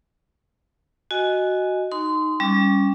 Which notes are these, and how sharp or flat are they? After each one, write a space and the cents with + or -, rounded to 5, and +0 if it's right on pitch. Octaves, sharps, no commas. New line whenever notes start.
F#4 +0 D#5 +0 G#5 +0
D#4 +0 C6 -20
G3 +10 C#4 +0 D6 -15